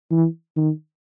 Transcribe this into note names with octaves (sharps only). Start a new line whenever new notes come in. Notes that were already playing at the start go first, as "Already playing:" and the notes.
E3
D#3